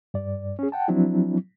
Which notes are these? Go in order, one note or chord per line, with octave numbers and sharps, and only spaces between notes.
G2 D5
C#4 G#4
F#5 G5 A5
F3 F#3 C4 D4 E4